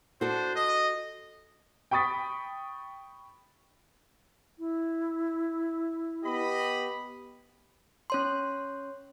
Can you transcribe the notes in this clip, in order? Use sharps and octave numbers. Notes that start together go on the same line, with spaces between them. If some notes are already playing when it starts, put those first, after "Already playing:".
D4 F#4 A4 C5
D#5
G5 B5 C#6 D#6 A6 B6
E4
B3 G4 D#5 B5
C#4 C#5 C6